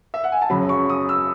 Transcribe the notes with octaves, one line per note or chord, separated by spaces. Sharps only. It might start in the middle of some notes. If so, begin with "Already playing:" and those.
E5
F#5
G#5
A5
F#2 C#3 F#3 B5
C#6
D#6
E6